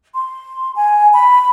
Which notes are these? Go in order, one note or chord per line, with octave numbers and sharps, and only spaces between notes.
C6
G#5
B5